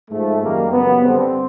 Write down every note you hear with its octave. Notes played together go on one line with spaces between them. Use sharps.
G#2 F3 A3
F#2 D#3 G3 A#3
F#2 C#3 E3 G3 B3
G2 D3 G3 C4